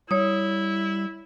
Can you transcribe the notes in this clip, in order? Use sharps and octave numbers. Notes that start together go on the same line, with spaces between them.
G3 E4 C#5 D#6